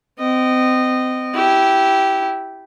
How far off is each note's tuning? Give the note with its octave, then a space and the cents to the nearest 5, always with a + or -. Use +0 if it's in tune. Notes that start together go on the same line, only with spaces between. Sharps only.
C4 -30 D#5 -15
E4 -5 G4 -15